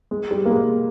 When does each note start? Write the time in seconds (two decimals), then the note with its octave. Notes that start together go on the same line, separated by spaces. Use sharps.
0.11 G#3
0.31 G3
0.45 A#3
0.50 G#3